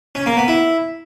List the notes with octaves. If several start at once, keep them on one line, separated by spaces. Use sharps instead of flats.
C#4
A#3
B3
E4